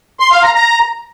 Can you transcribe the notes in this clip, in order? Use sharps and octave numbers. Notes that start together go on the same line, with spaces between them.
C6
F5
A#5
A#5